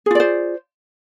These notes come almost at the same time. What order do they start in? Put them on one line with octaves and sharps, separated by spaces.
G#4 F4 D5 C5